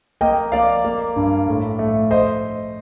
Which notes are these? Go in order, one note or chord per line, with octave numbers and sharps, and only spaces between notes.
A#3 D#5 G5
A#3 D5 F5
A#3
G2
A2
A3
C5 D#5